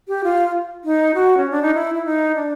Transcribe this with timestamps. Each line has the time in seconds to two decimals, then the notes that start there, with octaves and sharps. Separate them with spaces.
0.08 G4
0.24 F4
0.84 D#4
1.15 F#4
1.37 C#4
1.51 D4
1.62 D#4
1.74 E4
1.95 E4
2.05 D#4
2.35 D4